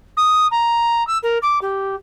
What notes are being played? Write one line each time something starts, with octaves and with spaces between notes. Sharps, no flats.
D#6
A#5
E6
A#4
D6
G4